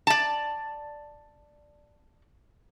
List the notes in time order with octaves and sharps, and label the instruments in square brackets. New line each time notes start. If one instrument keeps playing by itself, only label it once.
[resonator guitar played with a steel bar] D5 A5